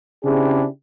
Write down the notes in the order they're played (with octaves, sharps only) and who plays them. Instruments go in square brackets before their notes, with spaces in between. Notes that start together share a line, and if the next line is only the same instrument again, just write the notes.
[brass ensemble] C#3 C4 D4 E4 G4 G#4